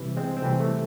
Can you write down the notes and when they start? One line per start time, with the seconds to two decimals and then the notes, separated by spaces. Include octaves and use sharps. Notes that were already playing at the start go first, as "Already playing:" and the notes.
Already playing: C2 C3 E3
0.17 G#3 C4
0.37 C4
0.42 C2 C3 E3 A3
0.60 A3